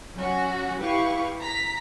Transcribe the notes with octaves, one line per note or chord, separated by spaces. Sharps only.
F#3 C#4 F#4
E4 G4 B4 F5 C#6
A#5 B6